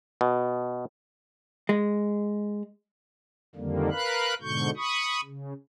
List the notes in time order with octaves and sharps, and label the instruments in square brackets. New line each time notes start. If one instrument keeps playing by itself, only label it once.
[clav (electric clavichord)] B2
[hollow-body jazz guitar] G#3
[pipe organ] F2 D3 D#3 G3 A#3
A#4 B4 F5 B5 F#6
G#2 B2 D3 C#6 G6
B5 C#6 D#6
C#3